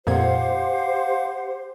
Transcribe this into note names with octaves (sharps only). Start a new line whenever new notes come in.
F2 A#2 G4 C5 F5 F#5 G#6